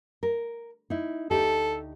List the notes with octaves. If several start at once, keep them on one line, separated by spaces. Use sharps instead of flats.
A#4
D#4 E4
D2 D#4 G4 A4